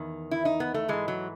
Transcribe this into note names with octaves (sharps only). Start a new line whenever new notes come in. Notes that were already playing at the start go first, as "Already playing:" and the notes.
Already playing: E2 D#3
E4
D#4
B3
A3
G#2 E3 G#3
F#3